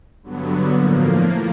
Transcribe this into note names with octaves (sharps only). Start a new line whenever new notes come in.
G2 D3 F#3 B3
A2 F3 A#3